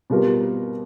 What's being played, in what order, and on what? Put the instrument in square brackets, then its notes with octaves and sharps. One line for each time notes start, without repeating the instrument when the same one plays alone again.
[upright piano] B2 G3 C4 F4 A#4